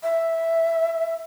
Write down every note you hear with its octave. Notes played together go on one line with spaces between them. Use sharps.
E5